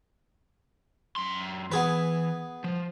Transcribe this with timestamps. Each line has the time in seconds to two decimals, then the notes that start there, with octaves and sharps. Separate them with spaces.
1.16 F#2 C6
1.72 E3 B3 G#4 B4
2.64 F3